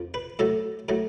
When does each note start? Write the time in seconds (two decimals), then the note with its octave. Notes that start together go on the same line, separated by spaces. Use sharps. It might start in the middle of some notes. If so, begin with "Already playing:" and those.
Already playing: F2 F3
0.14 B4
0.39 A2 F#3 A3 A4
0.89 A2 F#3 A3